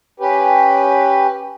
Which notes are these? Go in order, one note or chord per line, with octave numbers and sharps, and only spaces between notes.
C#4 G4 B4